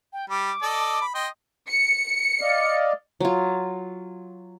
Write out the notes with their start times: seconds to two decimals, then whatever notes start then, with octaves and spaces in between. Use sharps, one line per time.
0.13 G5
0.30 G3 D6
0.62 A4 D5 D#5
1.02 B5
1.15 D#5 G5 C6 D#6
1.68 C#7
2.41 D5 D#5 F5
3.20 F#3 F4